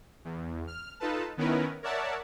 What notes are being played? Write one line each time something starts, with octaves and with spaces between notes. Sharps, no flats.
E2
F6
D#4 F4 A4 B4 A5
D#3 B3 C#4 E4 A#4 B4
A#4 C#5 D5 E5 F#5 A5